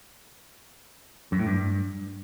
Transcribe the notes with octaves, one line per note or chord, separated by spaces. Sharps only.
F#2
A2
G2